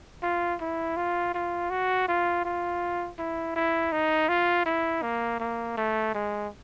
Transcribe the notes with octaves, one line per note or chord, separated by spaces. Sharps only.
F4
E4
F4
F4
F#4
F4
F4
E4
E4
D#4
F4
E4
A#3
A#3
A3
G#3